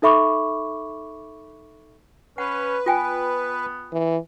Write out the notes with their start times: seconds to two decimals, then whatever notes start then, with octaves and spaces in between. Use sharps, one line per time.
0.02 D#4 A4 E5 B5 C#6 D6
2.38 C#4 B4 F#5
2.86 B3 F4 G5 G#5
3.93 E3